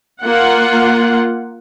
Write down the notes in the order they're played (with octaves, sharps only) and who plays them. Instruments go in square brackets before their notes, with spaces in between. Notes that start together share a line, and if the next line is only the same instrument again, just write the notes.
[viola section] A#3 F4 F#5